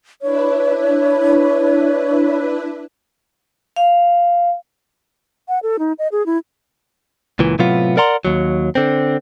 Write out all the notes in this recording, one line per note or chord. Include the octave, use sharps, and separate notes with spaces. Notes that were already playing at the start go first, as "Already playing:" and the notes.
D4 E4 B4 C#5
F5
F#5
A4
D#4
D#5
G#4
E4
C#2 A#2 E3
A2 C3 F#3 B3 F4
A#4 D5 F#5 A#5 C6
D#2 F#3
D3 C4